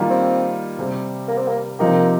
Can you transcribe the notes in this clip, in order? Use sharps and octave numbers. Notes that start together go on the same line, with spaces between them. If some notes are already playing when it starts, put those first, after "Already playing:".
Already playing: D#3 G3 A#3 F4
C4
C3 G3 C4
A#3
C4
A#3
C3 F3 A#3 D#4 G4